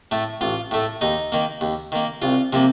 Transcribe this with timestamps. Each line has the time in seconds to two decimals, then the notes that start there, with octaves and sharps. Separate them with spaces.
0.11 A2 A3
0.41 A1 F4
0.71 A2 A3
1.01 D#2 D#4
1.32 D#3 A#3
1.61 D#2
1.92 D#3 A#3
2.22 C2 F4
2.53 C3 F3 A#3